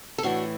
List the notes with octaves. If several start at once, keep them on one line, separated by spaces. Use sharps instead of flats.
A4
A2 E3 D4 F#4